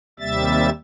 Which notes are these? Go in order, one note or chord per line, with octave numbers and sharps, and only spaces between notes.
D#2 C3 G3 E5 A6